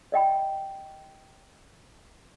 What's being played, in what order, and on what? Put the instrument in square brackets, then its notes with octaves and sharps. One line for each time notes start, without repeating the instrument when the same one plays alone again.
[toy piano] D5 D#5 G5 B5